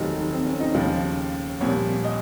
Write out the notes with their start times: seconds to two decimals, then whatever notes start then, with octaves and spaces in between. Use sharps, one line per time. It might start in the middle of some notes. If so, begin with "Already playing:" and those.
Already playing: F1 D#2 D#3 F#3 D#4
0.32 C4
0.46 C#4
0.60 D#4
0.74 D#2 C#3 F3 F4
1.61 C2 A#2 F3 C#5
2.04 D#5